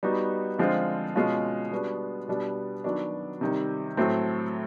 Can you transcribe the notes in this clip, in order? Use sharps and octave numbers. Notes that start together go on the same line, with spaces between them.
G3 B3 D#4 F#4
D3 F3 G#3 C4 F4
B2 G#3 C#4 F4
G3 B3 D4 F#4
B2 G3 B3 D4
D#3 F#3 B3 D4 F#4
C3 D#3 G3
A2 F#3 A3 C4